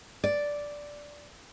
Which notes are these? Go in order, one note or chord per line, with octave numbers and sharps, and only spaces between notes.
D5